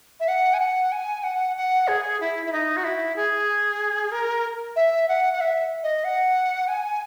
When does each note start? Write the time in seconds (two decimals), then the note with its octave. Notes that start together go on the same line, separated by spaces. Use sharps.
0.20 E5
0.28 F#5
0.54 G#5
0.60 F#5
0.92 G#5
1.24 F#5
1.56 F#5
1.88 G#4
2.20 E4
2.46 E4
2.53 D#4
2.77 F#4
2.84 E4
3.16 G#4
4.12 A#4
4.76 E5
5.08 F#5
5.33 F#5
5.41 E5
5.83 D#5
6.04 F#5
6.68 G#5